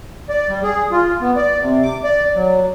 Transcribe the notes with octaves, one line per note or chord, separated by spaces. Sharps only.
D5
G3
G#4
F4
B3
D5
C3
D6
D5
F#3